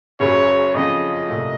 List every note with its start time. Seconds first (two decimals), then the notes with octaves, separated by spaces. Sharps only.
0.20 F#1 F#2 C#3 F#3 C#5
0.74 F2 C#3 F3 D#5
1.29 C2 A#2 A3